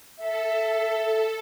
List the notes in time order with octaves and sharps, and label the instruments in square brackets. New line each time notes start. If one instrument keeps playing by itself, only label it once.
[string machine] A4 [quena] E5